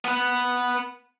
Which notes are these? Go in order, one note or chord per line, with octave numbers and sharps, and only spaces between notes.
B3 B4